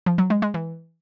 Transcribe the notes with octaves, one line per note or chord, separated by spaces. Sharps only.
F3
F#3
G#3
G#3
E3